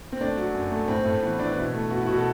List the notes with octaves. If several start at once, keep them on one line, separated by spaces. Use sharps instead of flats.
C4
A3 D4
F#3
F#2
A3
A2 C4
A2 A3
E3 B3
E3 D4
B2 E4
A3
B2 F#4
E4
B2 F#4
A4